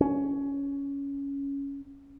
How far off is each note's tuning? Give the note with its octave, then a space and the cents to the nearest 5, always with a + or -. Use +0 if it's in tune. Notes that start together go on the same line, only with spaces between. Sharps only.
C#4 +10